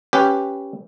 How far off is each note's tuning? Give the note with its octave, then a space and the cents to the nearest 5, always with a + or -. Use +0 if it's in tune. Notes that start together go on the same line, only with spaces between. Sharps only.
C#4 +0 G4 +0 B4 +0